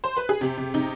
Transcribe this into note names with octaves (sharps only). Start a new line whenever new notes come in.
C5
B4
G#4
C3 G4
C3
C3 D#4